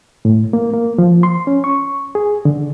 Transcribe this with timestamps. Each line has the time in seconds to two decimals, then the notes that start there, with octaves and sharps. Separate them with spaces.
0.25 A2
0.53 A#3
0.74 A#3
0.98 F3
1.23 C6
1.47 C#4
1.64 C#6
2.15 G#4
2.45 D3